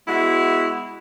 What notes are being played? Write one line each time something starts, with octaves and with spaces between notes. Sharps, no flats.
G#3 B3 E4 F#4